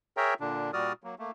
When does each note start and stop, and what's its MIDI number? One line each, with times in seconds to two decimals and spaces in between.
0.17 0.34 68
0.17 0.34 70
0.17 0.34 73
0.17 0.34 76
0.17 0.34 79
0.17 0.34 82
0.40 0.71 46
0.40 0.71 50
0.40 0.71 62
0.73 0.93 46
0.73 0.93 55
0.73 0.93 66
0.73 0.93 74
0.73 0.93 87
0.73 0.93 89
1.04 1.15 54
1.04 1.15 58
1.19 1.31 57
1.19 1.31 58